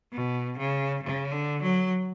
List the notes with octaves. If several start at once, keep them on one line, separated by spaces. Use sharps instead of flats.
B2
C#3
C#3
D3
F#3